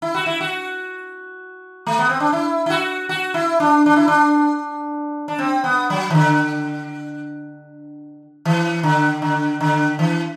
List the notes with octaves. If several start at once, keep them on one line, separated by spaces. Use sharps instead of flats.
E4
F#4
E4
F#4
A3
B3
C4
D4
E4
E4
F#4
F#4
E4
D4
D4
E4
D4
D4
C4
B3
F#3
E3
D3
E3
D3
D3
D3
E3